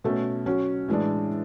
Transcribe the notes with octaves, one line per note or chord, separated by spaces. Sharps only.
B2 A3 C#4
F#3 C#4 F#4
A2 E3 G#3 D4